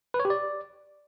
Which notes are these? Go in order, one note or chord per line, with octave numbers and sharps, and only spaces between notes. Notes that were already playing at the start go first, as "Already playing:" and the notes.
B4
C#5
G4
D5